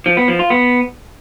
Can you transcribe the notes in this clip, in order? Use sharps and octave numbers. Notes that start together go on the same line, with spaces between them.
F3
B3
F3
F4
B3